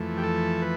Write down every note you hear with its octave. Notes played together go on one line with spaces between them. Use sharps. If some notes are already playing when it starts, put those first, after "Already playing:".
Already playing: F2 E3 A3
G4
A4
B4